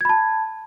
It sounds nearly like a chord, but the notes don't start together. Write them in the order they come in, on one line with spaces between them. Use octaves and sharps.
G#6 B5 A5